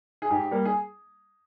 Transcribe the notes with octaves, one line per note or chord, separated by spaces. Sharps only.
G#4
G#2 G4
G3 A#3
G#4